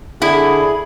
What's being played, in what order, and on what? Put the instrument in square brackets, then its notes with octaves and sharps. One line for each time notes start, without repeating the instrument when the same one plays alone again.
[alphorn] D3 [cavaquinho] E4 [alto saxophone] G#4 [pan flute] B5